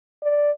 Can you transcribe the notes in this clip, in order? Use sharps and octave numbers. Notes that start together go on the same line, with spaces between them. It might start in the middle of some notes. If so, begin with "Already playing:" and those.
D5